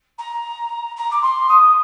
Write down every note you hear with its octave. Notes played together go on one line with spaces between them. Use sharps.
A#5
A#5
D6
C6
D#6